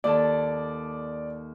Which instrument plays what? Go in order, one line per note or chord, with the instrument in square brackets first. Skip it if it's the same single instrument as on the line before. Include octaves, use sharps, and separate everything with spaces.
[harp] D#2 A4 [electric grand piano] D5